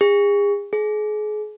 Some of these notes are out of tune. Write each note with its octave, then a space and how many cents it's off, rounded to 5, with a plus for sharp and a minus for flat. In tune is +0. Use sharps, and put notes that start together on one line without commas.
G#4 -35
G#4 +30